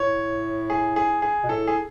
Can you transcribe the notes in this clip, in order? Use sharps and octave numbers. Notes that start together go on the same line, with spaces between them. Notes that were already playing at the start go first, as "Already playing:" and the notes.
Already playing: A2 C#5
G#4
G#4
G#4
B2
A2 A4
G#4